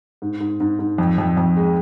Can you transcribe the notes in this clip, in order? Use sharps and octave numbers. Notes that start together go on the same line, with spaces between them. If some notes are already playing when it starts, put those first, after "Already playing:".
G#2
G#2
G#2
G#2
F2
F2
F2
G#3